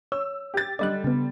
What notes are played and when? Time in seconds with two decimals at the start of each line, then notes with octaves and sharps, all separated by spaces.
0.12 C#5 E6
0.54 G4 A6
0.79 D3 G3 D5 D#5 F#6
1.04 C#3 B3